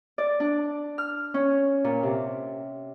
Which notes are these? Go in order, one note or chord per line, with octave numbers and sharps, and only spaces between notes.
D5
D4
F6
C#4
A#2
C3